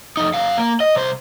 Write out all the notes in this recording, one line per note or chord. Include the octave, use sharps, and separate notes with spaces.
F2 D#4
F#2 F5
A#3
D#5
C2 C5